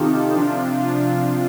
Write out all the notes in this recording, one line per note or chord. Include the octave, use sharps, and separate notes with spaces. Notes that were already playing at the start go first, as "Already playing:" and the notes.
Already playing: C3 D#3 D#4 F4 G4 A4
C3 F3 D4 F4
D4 F4